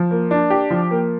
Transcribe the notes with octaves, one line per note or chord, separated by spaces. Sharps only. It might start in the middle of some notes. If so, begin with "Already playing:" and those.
Already playing: F3
A#3
D4
G4
F3
A#3